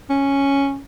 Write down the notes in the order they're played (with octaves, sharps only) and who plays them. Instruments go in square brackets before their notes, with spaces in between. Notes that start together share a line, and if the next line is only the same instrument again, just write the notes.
[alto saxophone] C#4